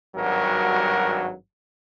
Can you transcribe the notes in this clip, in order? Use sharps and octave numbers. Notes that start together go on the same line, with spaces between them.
G#1 G2 F#3 G3 F#4 A#4